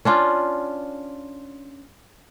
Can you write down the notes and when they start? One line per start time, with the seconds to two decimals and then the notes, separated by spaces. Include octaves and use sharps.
0.05 C#4 D4 F4